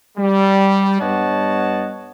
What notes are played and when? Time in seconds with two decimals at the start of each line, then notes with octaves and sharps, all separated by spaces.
0.18 G3
1.01 G2 B3 C#5 D#5 F#5 A5